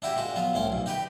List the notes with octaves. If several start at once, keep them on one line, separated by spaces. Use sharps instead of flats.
D4 E4 F#4 G4
A#2 G#3 F#4
F#3 B3 F4
C2 A2 C#4 C6
B1 A#2
D#4 G4 B4 G5